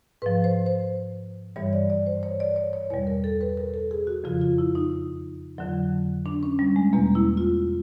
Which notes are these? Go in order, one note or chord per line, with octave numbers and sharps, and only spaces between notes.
G#2 F3 B4
C5
C5
G2 E3 G3 C#5
D5
D5
C5
C#5
D5
C#5
C#5
E2 B2 G3 C#5
A#4
A4
B4
A#4
A4
G#4
F#4
F2 C#3 F3 F4
F4
E4
D#4
F2 D3 F#3
D4
C#4
G3
G#3
E2 B2 G3 A#3
E4
F4